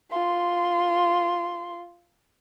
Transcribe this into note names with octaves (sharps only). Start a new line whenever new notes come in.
F4 C6